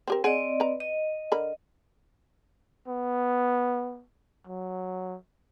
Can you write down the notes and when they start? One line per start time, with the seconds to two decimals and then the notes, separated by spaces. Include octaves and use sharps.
0.08 C4 G4 A#4
0.24 C4 G#4 D5 D#5 F#5
0.60 B4 A#5
0.80 D#5
1.32 D3 A#4 B5
2.88 B3
4.47 F#3